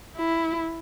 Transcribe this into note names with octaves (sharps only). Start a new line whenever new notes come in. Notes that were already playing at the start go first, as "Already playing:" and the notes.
E4